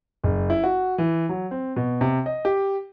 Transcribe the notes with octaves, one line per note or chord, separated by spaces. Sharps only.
F#1
E4
F#4
E3
F#3
C4
B2
C3
D#5
G4